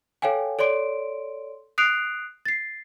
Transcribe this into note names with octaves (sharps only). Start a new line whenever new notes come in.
A4 C#5 F5 G5 G#5
A4 C#5 D5 C6 D7
D#6 F#6 C7 D7 F7
A6 C7